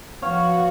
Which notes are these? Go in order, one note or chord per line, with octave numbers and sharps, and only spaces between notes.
F3 B3 F#4 C#5 F5